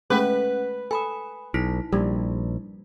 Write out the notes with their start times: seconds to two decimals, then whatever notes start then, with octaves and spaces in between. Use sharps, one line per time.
0.10 G#3 A3 C#4 B4 F#5 G5
0.91 A4 G#5 B5 D#6
1.54 B1 D#4 E4 B6
1.93 A#1 G3